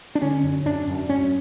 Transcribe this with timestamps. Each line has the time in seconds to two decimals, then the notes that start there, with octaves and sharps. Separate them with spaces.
0.15 D4
0.22 D3 C#4
0.44 F#2
0.65 F#2 D4
0.87 F#2
1.09 F#2 C#4